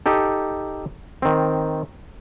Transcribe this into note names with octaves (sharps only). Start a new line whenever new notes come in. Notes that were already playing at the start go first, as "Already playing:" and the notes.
D#4 G4 A4
D#3 C4